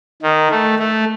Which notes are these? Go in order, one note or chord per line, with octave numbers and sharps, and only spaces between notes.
D#3
A3
A3